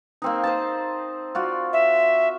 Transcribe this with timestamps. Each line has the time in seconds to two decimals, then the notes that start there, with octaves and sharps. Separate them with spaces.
0.22 A#3 C4 D#4
0.44 C5 D#5 A5
1.35 F4 F#4 D5
1.73 E5